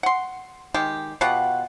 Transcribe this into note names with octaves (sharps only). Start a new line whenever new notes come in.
F#5 C6
D#3 G#3 G4
B2 F4 G4 F#5